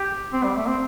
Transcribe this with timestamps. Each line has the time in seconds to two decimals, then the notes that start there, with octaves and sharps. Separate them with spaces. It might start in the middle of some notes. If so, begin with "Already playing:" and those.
Already playing: G4
0.33 C4
0.44 G3
0.57 A3
0.68 C4